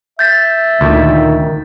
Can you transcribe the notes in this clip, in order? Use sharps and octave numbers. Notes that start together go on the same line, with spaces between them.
E5 G6 A6 B6
D2 A#2 D#3